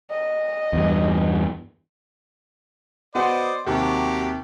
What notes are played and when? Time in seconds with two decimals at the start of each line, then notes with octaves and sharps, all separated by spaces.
0.11 D#5
0.73 E2 G2
3.15 B3 F#4 C5 D5 D#5 F#5
3.67 D#2 C3 F#3 G4